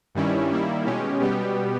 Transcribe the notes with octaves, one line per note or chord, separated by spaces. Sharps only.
G2 D#3 G3 C#4 E4
D#3 G3 A#3 E4
B2 G#3 C#4 G4
B2 G3 B3 G4